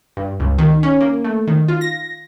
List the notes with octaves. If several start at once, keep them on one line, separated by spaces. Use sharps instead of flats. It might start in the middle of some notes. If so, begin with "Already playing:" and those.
G2
C#2
D#3
C#4
A#3
A3
D#3
F4
A#6